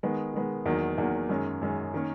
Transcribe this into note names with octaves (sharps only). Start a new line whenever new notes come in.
D#3 G#3 B3
D#3 G#3 B3
E2 D#3 F#3 A#3
E2 D#3 F#3 A#3
F#2 D#3 G#3 C#4
F#2 D#3 G#3 C#4
D#3 A#3 C#4